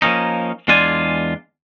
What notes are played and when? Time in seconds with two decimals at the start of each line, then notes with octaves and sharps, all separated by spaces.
0.02 F3 A#3 C#4 D#4
0.68 E2 G#3 D4 F4 D5 G#5